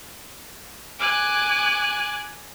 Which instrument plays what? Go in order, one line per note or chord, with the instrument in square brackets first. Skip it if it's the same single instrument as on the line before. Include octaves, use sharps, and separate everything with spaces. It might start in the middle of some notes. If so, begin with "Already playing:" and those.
[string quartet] G#5 D6 F#6